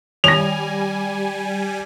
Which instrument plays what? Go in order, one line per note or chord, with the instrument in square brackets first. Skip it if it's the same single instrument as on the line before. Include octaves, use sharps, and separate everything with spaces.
[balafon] D#3 [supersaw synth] G3 G#5 [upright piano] A#6 F7